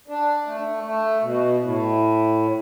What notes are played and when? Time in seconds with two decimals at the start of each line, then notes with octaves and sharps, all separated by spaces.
0.08 D4
0.46 A3
0.84 A3
1.22 B2
1.60 A2